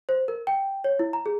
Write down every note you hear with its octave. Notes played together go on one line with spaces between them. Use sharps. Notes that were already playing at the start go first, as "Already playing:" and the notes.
C5
A#4
G5
C#5
E4
A#5
G#4